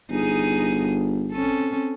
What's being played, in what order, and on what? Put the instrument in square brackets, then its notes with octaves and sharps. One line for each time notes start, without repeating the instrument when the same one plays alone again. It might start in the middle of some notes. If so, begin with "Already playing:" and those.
[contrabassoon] G1 [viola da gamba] D#4 G#4
[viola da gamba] C4 C#4 A4